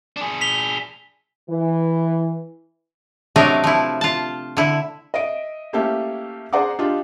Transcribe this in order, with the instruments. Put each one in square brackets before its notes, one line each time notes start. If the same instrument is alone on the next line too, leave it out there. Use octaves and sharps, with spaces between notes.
[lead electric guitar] D4 G#4
[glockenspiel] B6 F7 G7
[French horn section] E3
[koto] C3 F#3 A3 D4 A#4 D#5
F3 E4
F4 A5
D3 E4
[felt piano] D#5 E5 D7
A3 A#3 C#4 E4 G4 A4
G#4 C5 D5 F#5 A#5 D6
D4 D#4 F4 G4